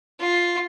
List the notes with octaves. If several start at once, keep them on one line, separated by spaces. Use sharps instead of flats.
F4